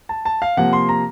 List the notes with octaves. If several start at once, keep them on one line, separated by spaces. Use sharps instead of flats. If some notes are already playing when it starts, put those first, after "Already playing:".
A5
A5
F5
C3 F3 A#3 F#5
C6
A#5